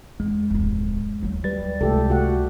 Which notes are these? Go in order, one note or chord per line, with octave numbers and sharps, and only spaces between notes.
E2 G#3
D1 F2
D#2 F#3
G3 B4 A6
C#2 C3 A3 G4 A4
F#4 G4 F#5